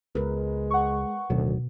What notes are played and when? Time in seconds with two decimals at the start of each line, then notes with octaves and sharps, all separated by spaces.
0.15 C#2 G#3 A#4 B4
0.71 F#5 C#6
1.30 D1 D2 B2 D#3 F#3